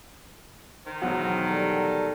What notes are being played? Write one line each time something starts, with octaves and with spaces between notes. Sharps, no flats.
D#3 C5
E1 F#3 F#5
G3 A4